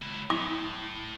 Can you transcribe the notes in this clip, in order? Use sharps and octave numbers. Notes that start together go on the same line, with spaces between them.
C#2 E4
A2 D6